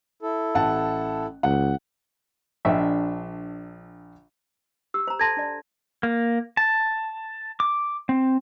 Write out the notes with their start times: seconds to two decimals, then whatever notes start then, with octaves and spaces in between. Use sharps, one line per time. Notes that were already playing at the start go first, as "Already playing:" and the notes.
0.23 E4 A4
0.55 A1 F#5 A5
1.43 C#2 F#5
2.65 A#1 D4 D#5 E5 G5
4.94 G4 E6
5.07 C5 A#5
5.19 A4 A5 C6 G#6 A#6
5.37 D4 D5
6.03 A#3
6.57 A5
7.60 D6
8.09 C4